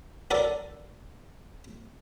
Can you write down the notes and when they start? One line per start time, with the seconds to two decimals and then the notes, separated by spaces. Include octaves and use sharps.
0.31 F#4 A4 A#4 D5 D6